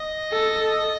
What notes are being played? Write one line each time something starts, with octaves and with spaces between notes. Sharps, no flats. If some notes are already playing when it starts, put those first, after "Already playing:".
Already playing: D#5
A4